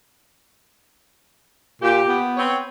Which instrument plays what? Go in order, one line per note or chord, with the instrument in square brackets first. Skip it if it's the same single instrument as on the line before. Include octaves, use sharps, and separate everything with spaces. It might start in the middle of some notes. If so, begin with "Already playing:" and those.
[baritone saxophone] A#2 [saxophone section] G4
[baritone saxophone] B3
[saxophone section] C4 B4 C#5